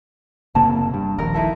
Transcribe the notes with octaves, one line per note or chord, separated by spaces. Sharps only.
F#1 C3 A#3 A5
G2
D#1 A#1 D#2 A#4
D#4 E4 A4